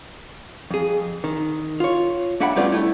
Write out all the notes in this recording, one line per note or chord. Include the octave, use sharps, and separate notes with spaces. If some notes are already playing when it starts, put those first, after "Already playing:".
F2 G#4
D#3
F4 C#5
A#3 D4 E5 F#5 G5 B5
G3 A3 B3 C#4 F4 D5
A3 E4